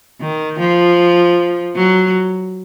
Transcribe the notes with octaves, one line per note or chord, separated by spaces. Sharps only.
D#3
F3
F#3